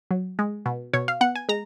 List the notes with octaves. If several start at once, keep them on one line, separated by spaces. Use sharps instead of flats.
F#3
G#3
B2
B2 C#5
F5
B3 F#5
G#5
G#3 A#5